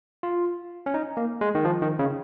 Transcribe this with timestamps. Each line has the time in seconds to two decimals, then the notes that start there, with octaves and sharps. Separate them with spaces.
0.23 F4
0.86 C#4
0.94 D#4
1.17 A#3
1.41 G#3
1.55 D#3
1.65 F3
1.82 D#3
1.99 C#3